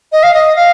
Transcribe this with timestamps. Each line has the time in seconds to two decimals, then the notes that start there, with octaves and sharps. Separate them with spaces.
0.12 D#5
0.23 F5
0.34 D#5
0.56 F5